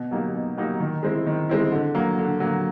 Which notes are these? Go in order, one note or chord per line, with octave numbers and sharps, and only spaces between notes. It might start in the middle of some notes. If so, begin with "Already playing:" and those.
Already playing: B2
F#3 A#3 D#4 G4
B2
F#3 A#3 D#4 G4
D#3
G#3 C4 E4
D#3
G#3 C4 E4
D3
F#3 A#3
D3
F#3 A#3